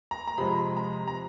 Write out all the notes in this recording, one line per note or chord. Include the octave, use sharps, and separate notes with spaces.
A#5
A#5
F2 C3 F3 G#3 B5
A#5
A#5